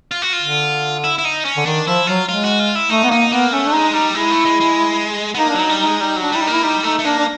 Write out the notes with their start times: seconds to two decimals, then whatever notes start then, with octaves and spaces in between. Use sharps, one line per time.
0.11 F4
0.22 F#4
0.33 F4
0.42 D3
1.04 E4
1.19 E4
1.25 D#4
1.45 C#4
1.57 D3
1.66 D#3 D4
1.87 F3 E4
2.07 F#3 F4
2.29 G#3 F4
2.44 F#4
2.59 F4
2.75 E4
2.90 A3 D#4
3.04 B3
3.10 A#3 D#4
3.31 A#3 B3
3.52 A3 C#4
3.66 D4
3.73 G#3 D#4
3.94 G3 D#4
4.14 G#3 E4
4.31 A3
4.45 G#3
4.60 G#3
5.35 B3
5.38 A#3 D#4
5.50 D4
5.55 F#3
5.60 D#4
5.69 G3
5.80 D#4
5.86 G#3
6.00 G3 D#4
6.16 F#3
6.22 D4
6.32 G3 E4
6.42 D#4
6.47 A#3
6.53 E4
6.63 G3 D#4
6.83 A3 D#4
6.99 A3
7.04 A#3 D4
7.18 D4